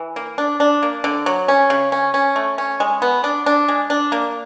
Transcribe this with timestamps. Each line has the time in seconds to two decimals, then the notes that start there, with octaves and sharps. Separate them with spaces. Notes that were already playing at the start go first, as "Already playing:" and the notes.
Already playing: E3
0.16 A#3
0.38 D4
0.60 D4
0.83 A#3
1.04 D3
1.26 F#3
1.48 C#4
1.70 C#3
1.92 C#4
2.14 C#4
2.36 A3
2.58 C#4
2.80 G#3
3.02 B3
3.24 D4
3.46 D4
3.68 G#3
3.90 D4
4.12 A#3